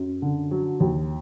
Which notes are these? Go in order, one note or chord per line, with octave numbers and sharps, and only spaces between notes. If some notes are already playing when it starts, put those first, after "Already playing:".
Already playing: F#2
D3
F#3
D#2